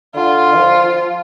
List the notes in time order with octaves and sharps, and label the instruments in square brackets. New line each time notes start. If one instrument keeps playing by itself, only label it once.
[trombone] D3 [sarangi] F4
[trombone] F3